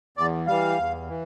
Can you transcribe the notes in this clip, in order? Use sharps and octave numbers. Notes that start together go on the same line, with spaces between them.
E2 D5
E3 G3 F5
E2
E3